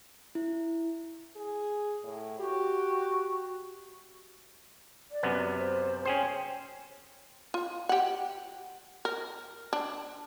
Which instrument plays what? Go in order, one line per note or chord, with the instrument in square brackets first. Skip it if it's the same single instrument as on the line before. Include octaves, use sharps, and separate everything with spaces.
[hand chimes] E4
[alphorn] G#4
A2
[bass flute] F#4 [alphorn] G4
[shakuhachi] D5
[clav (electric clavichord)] F#2 C3 B3
[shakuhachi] C5
[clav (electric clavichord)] C#4 G#4 C5 [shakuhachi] G5
[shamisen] F4
G4 F#5
A#4
D4